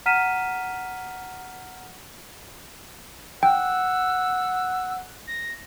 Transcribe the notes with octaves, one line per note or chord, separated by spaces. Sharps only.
F#5 A#5 F6 B6 D#7 E7
F#5 G5 E6
A#6